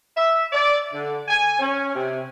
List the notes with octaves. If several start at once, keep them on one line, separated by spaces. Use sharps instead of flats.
E5
D5
D3
G#5
C#4
C3